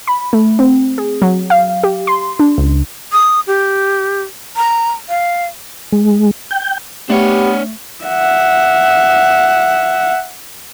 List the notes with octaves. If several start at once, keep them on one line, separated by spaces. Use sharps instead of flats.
B5
A3
C4
G#4
F#3
F5
G4
C6
D4
C#2
D#6
G4
A#5
F5
G#3
G5
A3 B3 D4 G4 C#5
E5 F#5